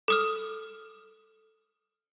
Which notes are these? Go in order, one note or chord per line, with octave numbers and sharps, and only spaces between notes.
A4 D#6 F6